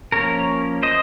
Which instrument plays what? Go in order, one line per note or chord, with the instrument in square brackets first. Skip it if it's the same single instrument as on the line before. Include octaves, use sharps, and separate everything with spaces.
[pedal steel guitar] F3 A#3 C#4 A#4 C#5
C5 D#5